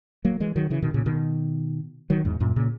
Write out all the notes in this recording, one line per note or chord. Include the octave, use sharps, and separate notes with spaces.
F#3 A#3
E3 G#3
D#3 F#3
C#3 E3
B2 D#3
A#2 C#3
B2 D#3
D#3 F#3
E2 G#2
F#2 A#2
A#2 C#3